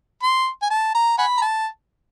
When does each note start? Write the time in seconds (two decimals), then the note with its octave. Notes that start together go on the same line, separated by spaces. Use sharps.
0.23 C6
0.62 G#5
0.70 A5
0.95 A#5
1.18 F#5 G#5 B5
1.37 A#5
1.42 A5